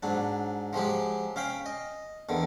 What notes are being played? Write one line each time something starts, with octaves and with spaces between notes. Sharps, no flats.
G#2 F#3 D4
F3 F#3 G#3 G4
C#4 F5 G5 B5
D#5
E2 D3 D#3